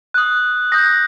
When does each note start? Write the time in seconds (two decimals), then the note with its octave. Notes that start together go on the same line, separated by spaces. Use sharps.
0.14 D#6 F#6
0.72 D#6 G6 A#6